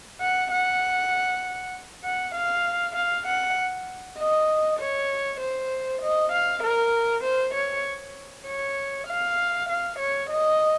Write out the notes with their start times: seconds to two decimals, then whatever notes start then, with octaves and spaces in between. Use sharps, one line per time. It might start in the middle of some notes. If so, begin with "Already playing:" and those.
0.21 F#5
0.51 F#5
2.04 F#5
2.35 F5
2.96 F5
3.27 F#5
4.18 D#5
4.80 C#5
5.40 C5
6.02 D#5
6.32 F5
6.63 A#4
7.24 C5
7.54 C#5
8.46 C#5
9.07 F5
9.69 F5
9.99 C#5
10.30 D#5